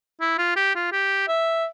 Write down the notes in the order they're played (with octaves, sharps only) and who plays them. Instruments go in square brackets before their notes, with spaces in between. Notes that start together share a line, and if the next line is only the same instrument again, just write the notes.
[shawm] E4
F4
G4
F4
G4
E5